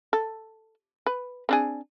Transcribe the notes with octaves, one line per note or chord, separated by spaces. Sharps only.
A4
B4
C4 D4 G#4